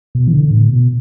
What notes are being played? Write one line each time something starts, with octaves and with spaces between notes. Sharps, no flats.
B2
E3
D3
A2
B2